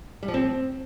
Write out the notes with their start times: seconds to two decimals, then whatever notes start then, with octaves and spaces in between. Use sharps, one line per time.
0.23 G3
0.28 F3
0.34 C4